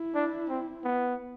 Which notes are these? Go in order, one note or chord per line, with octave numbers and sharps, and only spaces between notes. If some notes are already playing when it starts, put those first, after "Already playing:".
Already playing: E4
D4
C4
B3